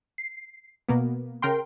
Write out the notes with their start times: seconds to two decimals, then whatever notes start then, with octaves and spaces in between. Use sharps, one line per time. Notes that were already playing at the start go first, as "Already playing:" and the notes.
0.18 C7
0.89 B2 A#3 B3
1.42 C#3 A#4 G5 C6